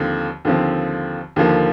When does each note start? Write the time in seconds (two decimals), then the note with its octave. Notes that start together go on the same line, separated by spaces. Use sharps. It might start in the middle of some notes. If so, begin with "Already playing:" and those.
Already playing: D#2 D3 F3 C4
0.45 D#2 D3 F3 C4
1.36 D#2 D3 F3 A#3